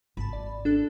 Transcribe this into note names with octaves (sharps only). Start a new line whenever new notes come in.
G#1 A5 B5
D5
D4 A4 F#6